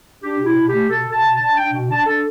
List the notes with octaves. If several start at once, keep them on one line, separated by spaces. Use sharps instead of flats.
D4 G4
B2
E4
B2
G4
A3
B2 A4
B2
A5
B2
A5
D4
D4 G5
B2
D4 A5
D4 A4